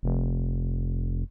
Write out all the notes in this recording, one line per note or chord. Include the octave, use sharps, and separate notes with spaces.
F1